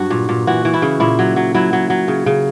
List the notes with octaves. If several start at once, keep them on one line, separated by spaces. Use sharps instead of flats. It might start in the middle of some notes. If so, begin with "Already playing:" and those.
Already playing: G2 F#3 F#4
A#2
A#2
E3 F#4
E3
E4
C#3
A#2 E4
F#3
F#3
F#3 E4
F#3
F#3
C#3
C#3